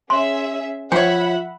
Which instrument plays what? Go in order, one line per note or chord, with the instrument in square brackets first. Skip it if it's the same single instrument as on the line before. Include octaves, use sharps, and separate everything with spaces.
[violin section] C#4 G#4 E5 [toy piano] C6
[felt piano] F3 [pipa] C5 C#5 [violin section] E5 F#5 B5 [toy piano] G5